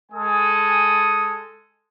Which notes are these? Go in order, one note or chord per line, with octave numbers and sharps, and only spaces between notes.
G#3 A4 G#5 D#6